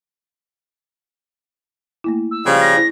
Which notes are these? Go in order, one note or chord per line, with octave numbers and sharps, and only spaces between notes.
A3 A#3 E4
E6
C#3 F3 G3 F5
A#6
E4 C5